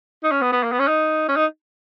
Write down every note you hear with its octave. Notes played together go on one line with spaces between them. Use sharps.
D#4
C#4
B3
B3
A#3
B3
C#4
D#4
C#4
D#4